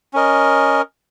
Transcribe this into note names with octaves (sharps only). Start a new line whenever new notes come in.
C#4 A#4 D#5